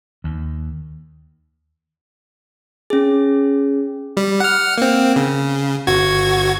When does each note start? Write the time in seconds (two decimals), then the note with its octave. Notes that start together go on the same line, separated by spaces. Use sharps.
0.24 D#2
2.90 C#4 G#4
4.17 G3
4.40 F#5 F6
4.78 A#3 C4
5.16 C#3
5.87 G1 F#4 G#6